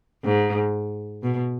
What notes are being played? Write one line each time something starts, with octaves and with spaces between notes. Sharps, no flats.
G#2
B2